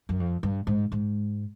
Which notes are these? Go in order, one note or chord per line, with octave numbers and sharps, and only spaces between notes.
F#2
F2
G2
G#2
G#2